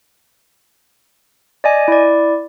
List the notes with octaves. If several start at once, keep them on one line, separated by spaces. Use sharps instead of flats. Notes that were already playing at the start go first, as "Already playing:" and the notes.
D5 D#5 G#5
E4 D5